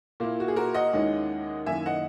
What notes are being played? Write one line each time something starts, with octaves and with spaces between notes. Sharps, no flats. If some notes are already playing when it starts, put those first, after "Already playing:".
A#2 A#3 E4
F#4
G#4
F#4 A#4
D#5 F#5
D#2 D#3 G#3 C#4 E4
F#2 D#3 A#3 E4 E5 G#5
D#5 F#5